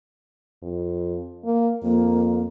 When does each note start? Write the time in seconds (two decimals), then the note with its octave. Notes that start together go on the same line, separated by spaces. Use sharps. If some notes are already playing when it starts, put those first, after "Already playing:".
0.62 F2
1.45 A#3
1.83 F2 A#3